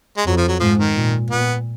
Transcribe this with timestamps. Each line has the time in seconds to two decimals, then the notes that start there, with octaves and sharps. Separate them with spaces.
0.17 G#3
0.26 F2 F#3
0.37 F3
0.49 F#3
0.60 G#2 F3
0.78 D#3
0.96 A#2
1.30 A#2 B3